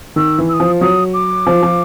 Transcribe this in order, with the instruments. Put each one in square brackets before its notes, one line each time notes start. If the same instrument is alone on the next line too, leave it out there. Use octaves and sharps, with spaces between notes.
[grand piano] D#3 [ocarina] E6
[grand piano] E3
[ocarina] E6
D#6
[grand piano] F3
[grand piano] F#3 [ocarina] D#6
[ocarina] D6
[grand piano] F3
F3